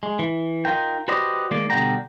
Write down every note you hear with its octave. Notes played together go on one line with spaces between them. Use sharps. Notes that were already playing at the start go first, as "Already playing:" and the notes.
G#3
E3
D#4 F4 A#4 G5
F#4 G4 B4 C5 D5 D#5
D#3 G#3 A#3 D5
B2 D3 G3 F#5 G5 A#5